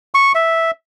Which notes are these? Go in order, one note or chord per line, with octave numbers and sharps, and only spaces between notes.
C#6
E5